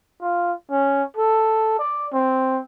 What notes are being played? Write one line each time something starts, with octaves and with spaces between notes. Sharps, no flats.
F4
C#4
A4
D5
C4